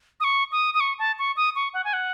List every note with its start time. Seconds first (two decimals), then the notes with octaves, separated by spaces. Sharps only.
0.20 D#6
0.24 C#6
0.52 D#6
0.74 D#6
0.80 C#6
0.99 A5
1.19 C#6
1.37 D#6
1.55 C#6
1.74 F#5
1.84 G#5
1.93 F#5